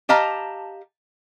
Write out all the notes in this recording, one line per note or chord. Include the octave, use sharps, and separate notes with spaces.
G4 D#5 F5 A5 A#5